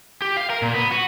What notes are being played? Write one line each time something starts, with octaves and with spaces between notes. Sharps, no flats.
G4
F5
A#4
A#2
B3
F#4